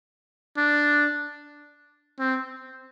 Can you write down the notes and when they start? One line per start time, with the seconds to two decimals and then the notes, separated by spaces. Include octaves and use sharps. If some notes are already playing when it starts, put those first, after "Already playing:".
0.57 D4
2.19 C4